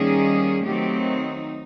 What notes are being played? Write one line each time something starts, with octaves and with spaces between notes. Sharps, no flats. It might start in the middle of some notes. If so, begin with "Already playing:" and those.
Already playing: D#3 G3 A#3 C#4 G#4
D#3 F#3 A3 C4 G4
D#4